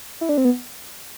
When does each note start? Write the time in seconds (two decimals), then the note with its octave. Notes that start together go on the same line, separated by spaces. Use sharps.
0.21 E4
0.29 D4
0.38 C4
0.45 B3